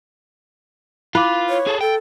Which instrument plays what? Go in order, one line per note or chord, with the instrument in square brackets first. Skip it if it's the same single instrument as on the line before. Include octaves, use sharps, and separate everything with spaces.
[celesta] E4 F5 D6 [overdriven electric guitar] F4 [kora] B4
[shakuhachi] C#5
[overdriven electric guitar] G#4 A4
[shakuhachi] A4 [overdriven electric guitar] G5